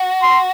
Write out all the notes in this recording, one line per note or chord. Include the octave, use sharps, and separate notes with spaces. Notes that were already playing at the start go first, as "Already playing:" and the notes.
Already playing: F#4
C6